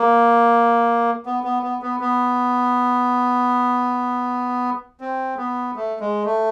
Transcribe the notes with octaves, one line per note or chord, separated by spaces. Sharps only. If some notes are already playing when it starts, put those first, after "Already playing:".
Already playing: A#3
B3
B3
B3
B3
B3
C4
B3
A3
G#3
A3